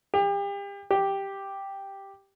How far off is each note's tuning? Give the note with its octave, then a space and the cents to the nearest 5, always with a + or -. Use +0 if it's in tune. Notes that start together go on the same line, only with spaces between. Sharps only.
G4 +35
G4 +0